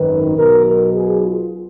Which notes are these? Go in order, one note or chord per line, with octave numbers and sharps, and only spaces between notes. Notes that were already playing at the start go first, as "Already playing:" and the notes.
Already playing: G#1 F#2 D#3 B4
B1 B2 A#4
A#4
G#4
F4